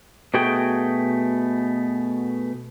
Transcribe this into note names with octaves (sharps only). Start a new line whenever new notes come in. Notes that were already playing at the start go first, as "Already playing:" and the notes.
B2 A3 F#4 G#4 G5